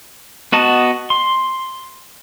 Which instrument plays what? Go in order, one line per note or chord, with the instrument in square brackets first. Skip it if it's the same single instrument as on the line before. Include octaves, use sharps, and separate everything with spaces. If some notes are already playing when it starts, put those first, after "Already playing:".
[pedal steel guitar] B3 F#4 D#5 A5
C6